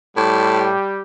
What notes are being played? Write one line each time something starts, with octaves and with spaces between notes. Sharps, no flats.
A2 G3 G4